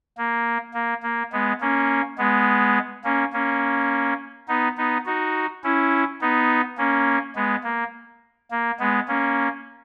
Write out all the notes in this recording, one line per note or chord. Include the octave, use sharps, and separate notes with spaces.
A#3
A#3
A#3
G#3 B3
A#3 C#4
G#3 B3
A#3 C#4
A#3 C#4
B3 D#4
B3 D#4
D#4 F#4
C#4 E4
B3 D#4
A#3 C#4
G#3 B3
A#3
A#3
G#3 B3
A#3 C#4